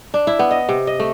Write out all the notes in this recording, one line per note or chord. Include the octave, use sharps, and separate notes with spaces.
D4
E4
B3
D#5
C3
D#5
A3